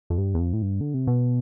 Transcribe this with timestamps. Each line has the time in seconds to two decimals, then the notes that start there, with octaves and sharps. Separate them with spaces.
0.10 F2
0.18 G2
0.34 E2
0.40 F2
0.53 A2
0.62 G2
0.81 D3
0.94 C3
1.07 B2